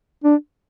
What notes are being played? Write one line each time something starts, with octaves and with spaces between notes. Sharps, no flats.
D4